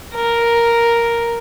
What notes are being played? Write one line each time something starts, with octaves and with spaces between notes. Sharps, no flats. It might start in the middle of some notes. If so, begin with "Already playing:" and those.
A#4